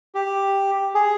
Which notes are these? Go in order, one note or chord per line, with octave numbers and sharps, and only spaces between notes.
G4
G#4